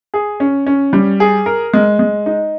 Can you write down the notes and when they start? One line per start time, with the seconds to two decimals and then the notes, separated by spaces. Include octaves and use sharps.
0.14 G#4
0.40 C#4
0.67 C#4
0.93 G3
1.20 G#4
1.46 A#4
1.74 G#3
1.99 G#3
2.26 D#4